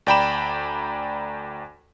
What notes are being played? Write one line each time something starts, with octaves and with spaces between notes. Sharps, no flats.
D2 D5 G5 A#5 B5 E7